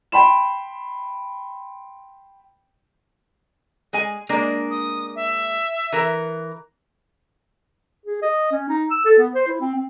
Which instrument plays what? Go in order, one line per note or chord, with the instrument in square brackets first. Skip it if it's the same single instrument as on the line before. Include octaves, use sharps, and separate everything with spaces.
[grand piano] G5 B5 C6 E7
[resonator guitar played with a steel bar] G#3 G#5
G#3 A#3 D4
[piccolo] D#6
E5
[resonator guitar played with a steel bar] E3 A#4
[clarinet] G#4
D#5
C#4
D#4
E6
A4
B3
C5
E4
C4
C4